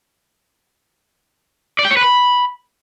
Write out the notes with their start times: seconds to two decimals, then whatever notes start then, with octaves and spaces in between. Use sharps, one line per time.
1.79 D5
1.85 G5
1.91 C#5
1.97 B4
2.03 B5